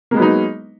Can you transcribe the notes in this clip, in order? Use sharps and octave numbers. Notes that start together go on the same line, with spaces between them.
F#3 G#3 A#3 B3 D#4